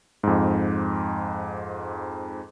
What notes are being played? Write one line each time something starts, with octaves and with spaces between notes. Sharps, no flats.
F2 G#2